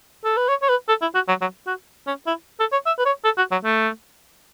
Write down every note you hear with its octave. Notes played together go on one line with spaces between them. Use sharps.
A4
B4
C#5
C#5
B4
A4
E4
F#4
F#3
F#3
F#4
C#4
E4
A4
C#5
E5
B4
C#5
A4
F#4
F#3
A3